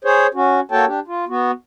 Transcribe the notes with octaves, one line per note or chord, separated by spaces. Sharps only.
G#4 C5 C#5
C#4 F#4
A#3 F#4 A4 C#5 G5 A5
D4 G4
F4
B3 F#4